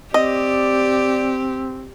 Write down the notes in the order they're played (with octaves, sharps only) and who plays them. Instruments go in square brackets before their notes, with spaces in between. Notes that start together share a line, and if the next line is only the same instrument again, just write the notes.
[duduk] C4 [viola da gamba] G4 [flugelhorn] D5 [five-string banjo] D#5